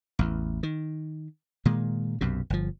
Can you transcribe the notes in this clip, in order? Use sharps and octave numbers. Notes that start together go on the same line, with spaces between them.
A1 E2
D#3
A#2 D#3 G#3
B1 F#2 C3
G1 F3